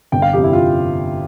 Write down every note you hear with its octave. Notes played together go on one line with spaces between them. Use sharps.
G1 G5
F5
F2 C3 G4
E4
F4